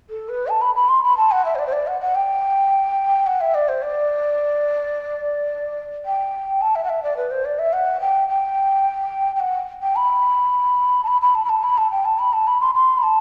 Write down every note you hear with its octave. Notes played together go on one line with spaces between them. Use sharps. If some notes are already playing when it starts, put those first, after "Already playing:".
A4
B4
A5
B5
B5
C6
B5
A5
F#5
E5
C5
D5
C5
D5
F#5
F#5
G5
F#5
E5
D5
C5
D5
G5
A5
E5
F#5
E5
D5
B4
C5
D5
E5
F#5
G5
G5
G5
F#5
G5
B5
A5
B5
B5
A5
B5
A5
B5
A5
G5
A5
B5
A5
B5
C6
C6
B5
A5